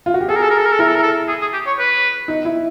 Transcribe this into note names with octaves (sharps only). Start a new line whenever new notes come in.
F4
F#4
G4
G#4 A4
A#4
A4
A#4
A4
A#4
A4
E4 A#4
A4
A#4
A4
G#4
G#4
G4
C#5
B4
D#4
E4